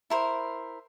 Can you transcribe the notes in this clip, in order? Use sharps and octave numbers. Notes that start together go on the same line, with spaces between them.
E4 A#4 C5